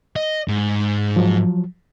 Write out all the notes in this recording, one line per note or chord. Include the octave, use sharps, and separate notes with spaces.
D#5
G#2
F3 F#3